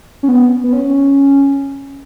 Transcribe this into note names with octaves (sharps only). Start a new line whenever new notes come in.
C#4
B3
B3
C#4